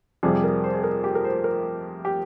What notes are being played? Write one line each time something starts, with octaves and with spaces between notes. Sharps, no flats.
F2 C3 G3 G#4
A#4
C5
G#4
A#4
G4
A#4
C5
A#4
G4